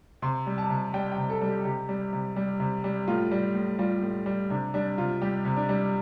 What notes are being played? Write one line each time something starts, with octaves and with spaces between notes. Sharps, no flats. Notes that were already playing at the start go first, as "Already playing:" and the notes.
C3 C6
G3
A5
C3
G3 G5
G5
C3
A4
G3
G4
C3 G4
G3
C3
G3
C3
G3
A2 F4
G3
A2
G3 F4
A2
G3
C3 D4
G3 D4
C3 F4
G3 G4
C3
D4
G3